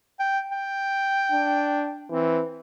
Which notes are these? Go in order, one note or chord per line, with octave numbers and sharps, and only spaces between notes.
G5
G5
D4
E3 C4